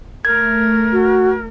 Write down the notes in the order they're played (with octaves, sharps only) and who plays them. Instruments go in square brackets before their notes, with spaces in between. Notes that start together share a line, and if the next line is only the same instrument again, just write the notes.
[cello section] A3 [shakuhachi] A#4 [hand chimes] G#6
[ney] F#4